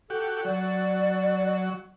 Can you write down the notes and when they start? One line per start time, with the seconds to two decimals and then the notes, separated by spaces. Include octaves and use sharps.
0.10 F#4 G4 A4
0.45 F#3 D5